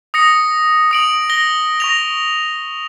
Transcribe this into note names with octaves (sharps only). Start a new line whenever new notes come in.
D#6 A#6 C#7
D#6 D7 F#7
A#6 G7
C#6 A#6 F7